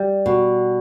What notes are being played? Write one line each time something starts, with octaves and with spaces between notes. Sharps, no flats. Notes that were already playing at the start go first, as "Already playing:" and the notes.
Already playing: G3
B2